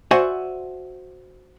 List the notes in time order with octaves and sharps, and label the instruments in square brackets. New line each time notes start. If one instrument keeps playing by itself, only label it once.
[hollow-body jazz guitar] F#4 C5 D5 E5 F#5 G#5